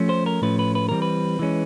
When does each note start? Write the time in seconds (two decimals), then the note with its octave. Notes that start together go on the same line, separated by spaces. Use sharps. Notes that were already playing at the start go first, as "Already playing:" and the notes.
Already playing: F3 A3 C#4
0.09 C5
0.26 A#4
0.42 A2 F3 A3 C#4 B4
0.59 B4
0.75 B4
0.89 E3 G3 C4 A#4
1.02 B4
1.39 E3 G#3 C#4